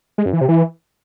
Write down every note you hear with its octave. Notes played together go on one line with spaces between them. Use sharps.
G#3
F#2
E3
C3
E3